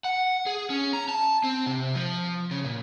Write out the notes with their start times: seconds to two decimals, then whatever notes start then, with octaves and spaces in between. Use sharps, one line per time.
0.04 F#5
0.46 G#4
0.70 C#4
0.93 A#5
1.09 A5
1.44 C4
1.66 C3
1.95 F3
2.51 C#3
2.65 A#2